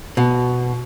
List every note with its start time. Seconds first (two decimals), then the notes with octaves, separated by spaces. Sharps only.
0.17 B2